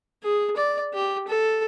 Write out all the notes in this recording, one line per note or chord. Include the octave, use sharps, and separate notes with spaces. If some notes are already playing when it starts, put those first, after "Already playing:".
G#4
D5
G4
A4